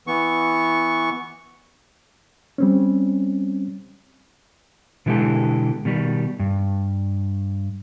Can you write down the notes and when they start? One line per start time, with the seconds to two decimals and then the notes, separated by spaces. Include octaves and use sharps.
0.07 E3 B3 C#6
2.58 G3 C4 C#4
5.06 B2 D3 E3 G#3 G4 A4
5.85 B2 D#3 G3
6.39 G2